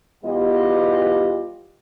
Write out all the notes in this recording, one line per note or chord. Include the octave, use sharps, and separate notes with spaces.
E2 G3 B3 F4 G4 D#5